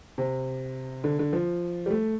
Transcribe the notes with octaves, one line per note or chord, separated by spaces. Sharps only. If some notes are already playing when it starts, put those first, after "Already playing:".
C3
D3
D3
F3
G3
A3